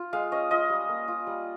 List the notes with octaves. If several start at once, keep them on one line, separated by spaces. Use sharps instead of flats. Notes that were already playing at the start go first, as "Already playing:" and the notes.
Already playing: F4
G#3 F5
C#4 D#5
F4 D#5
G3
A#3
F4
G3